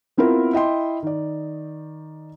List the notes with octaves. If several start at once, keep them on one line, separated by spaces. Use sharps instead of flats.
B3 C4 E4 F4 A#4
E4 D#5 G5 C6
D#3 D5